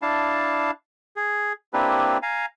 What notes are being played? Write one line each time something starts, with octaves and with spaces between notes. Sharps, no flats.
D4 E4 F5 A5
G#4
A#3 C4 D4 E4 G4 B4
F5 G#5 A#5